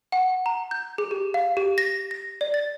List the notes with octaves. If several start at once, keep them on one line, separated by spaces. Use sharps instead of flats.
F#5
A#5
G6
G#4
G4
F5
G4
A#6
A#6
D5
A6